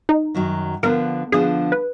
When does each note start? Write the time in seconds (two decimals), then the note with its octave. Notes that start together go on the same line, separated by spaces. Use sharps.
0.09 D#4
0.34 F#2 D#3 F#3
0.83 D3 F3 B3 D4 A#4
1.32 D3 F3 B3 D4 G#4
1.72 B4